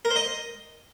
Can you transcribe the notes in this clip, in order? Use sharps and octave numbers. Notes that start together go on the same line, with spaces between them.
A#4
C5
D#5